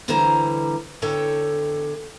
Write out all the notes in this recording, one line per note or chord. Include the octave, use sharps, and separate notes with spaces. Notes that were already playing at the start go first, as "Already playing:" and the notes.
D2 D3 E3 G3 C5 A#5
E2 D3 A4 C#5 G5